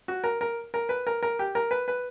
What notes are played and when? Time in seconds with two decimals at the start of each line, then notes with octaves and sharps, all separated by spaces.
0.08 F#4
0.24 A#4
0.41 A#4
0.74 A#4
0.89 B4
1.07 A#4
1.23 A#4
1.39 G4
1.55 A#4
1.71 B4
1.88 B4